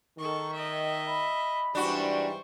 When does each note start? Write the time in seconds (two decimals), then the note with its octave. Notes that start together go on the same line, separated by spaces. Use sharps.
0.19 D#3 A4 C#6
0.53 D#5 E5
1.07 B5
1.75 G#2 E3 G3 D4 F#4 C5 C#6